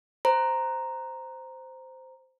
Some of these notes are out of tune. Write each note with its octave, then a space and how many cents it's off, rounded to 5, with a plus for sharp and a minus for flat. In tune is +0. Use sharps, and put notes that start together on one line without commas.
C5 -10 A#5 +0